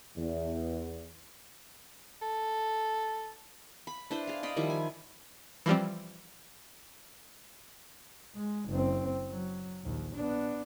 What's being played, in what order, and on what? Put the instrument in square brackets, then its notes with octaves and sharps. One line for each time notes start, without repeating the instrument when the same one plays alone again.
[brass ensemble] E2
[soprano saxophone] A4
[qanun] B5
D4 E4 B4 C5
G#4 F5
D5 D#5 F5 B5
D#3 F3 G3 E4
G#5
[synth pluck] E3 F3 G3 C4
[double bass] G#3
F#1 C4
F#3
A#1 D#2
B3 D4